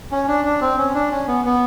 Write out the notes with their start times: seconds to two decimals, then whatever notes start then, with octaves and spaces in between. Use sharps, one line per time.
0.12 C#4
0.28 D4
0.45 D4
0.61 C4
0.78 C#4
0.94 D4
1.11 C#4
1.28 B3
1.45 B3